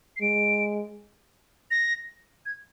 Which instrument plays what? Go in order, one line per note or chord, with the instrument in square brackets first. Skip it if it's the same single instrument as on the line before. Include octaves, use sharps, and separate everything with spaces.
[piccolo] C7
[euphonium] G#3 [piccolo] D7
[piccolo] A#6
G#6